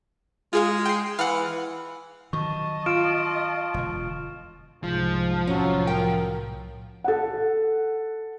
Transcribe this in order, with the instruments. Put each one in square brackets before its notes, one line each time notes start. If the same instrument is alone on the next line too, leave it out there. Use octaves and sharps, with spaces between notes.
[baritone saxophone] G#3 [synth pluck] F4 G#4 F5
[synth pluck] G5 C7
[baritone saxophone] E3 [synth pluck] F5 F#5
[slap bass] D#3 F#3 [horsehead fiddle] D#5 A5 [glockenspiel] C#6
[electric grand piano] F4 [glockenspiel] F6 D7 E7
[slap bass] E1 D3
[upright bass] C2 [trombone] G#2 [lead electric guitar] F3
[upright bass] C2 A2 [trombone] F#3 [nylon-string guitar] C#4
[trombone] A#4 [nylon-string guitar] G5
[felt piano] A4 F#5